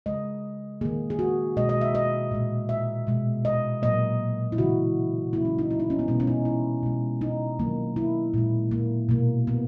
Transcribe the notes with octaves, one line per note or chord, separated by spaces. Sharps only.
C#3 G#3 D#5
D#3 A#3 G#4
G#4
F#4
B2 G#3 D#5
D#5
E5
D#5
A#2 G#3
E5
B2 G#3
D#5
A#2 F#3 A#3 D#5
E4
C#3 E3 G#3 F#4
C#3 F#3 A#3 E4
C#4
D#4
E4
D#4
C#4
B3
B2 G#3 C#4
C#4
D#4
E4
B2 G#3
D#4
D#3 F#3 A#3
E4
A#2 G#3
A#3
B2 A#3
B3